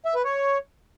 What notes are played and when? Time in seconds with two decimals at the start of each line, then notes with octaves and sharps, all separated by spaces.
0.05 E5
0.15 B4
0.25 C#5